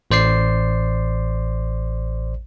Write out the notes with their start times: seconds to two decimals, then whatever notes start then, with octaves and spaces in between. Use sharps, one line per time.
0.11 A1 C5 D5 C7